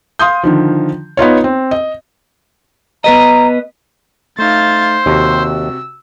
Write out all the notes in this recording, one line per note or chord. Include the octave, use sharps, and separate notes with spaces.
F5 C6 D#6 G6
D3 D#3 F3
B3 D#4 F4 C#5
C4
D#5
B3 B4 D#5 A#5
A3 D#4 C5 F5 A6
D#2 C3 F#4 E6